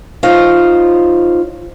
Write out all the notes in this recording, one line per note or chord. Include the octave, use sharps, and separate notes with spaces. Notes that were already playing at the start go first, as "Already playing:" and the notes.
D#4 F4 C5 C#5